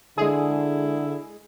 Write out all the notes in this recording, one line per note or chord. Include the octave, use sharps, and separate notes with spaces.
D3 G#3 E4 G#4